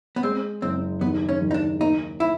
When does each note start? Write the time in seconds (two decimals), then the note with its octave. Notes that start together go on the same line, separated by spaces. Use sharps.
0.16 B3
0.23 G#3 C4
0.62 F#1 C4
1.01 D#2 B3
1.29 C#4
1.42 D#2
1.51 D#4
1.54 D4
1.81 A#3 D#4
2.20 E4